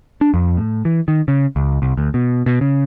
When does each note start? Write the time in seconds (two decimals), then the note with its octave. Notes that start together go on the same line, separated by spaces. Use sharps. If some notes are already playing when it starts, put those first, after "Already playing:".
0.21 D4
0.34 F2
0.57 A2
0.85 E3
1.08 D#3
1.28 C#3
1.56 C#2
1.82 C2
1.97 D2
2.14 B2
2.46 B2
2.61 C#3